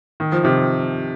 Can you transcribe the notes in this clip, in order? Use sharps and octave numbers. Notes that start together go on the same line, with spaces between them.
D#3
F3
C3 D#3